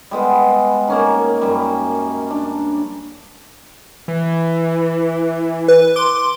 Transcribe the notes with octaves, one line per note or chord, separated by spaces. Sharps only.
G3 G#3 B3
A#3 C#4 D#4
F#2 G3
D4
E3
B4
C6 D6